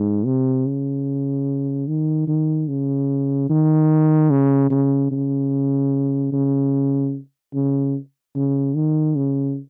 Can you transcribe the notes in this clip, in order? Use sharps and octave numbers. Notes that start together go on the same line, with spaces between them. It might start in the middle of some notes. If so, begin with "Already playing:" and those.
Already playing: G#2
C3
C#3
D#3
D#3
C#3
D#3
C#3
C#3
C#3
C#3
C#3
C#3
D#3
C#3